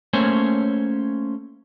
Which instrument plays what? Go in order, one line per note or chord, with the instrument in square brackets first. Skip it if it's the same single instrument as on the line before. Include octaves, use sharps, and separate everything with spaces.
[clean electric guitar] A3 A#3 C#4 C5 C#5 G#5